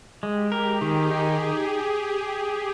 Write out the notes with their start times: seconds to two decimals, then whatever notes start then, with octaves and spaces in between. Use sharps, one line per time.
0.23 G#3 G4
0.52 A#4
0.67 G#4
0.81 D#3
1.11 D#4 G#4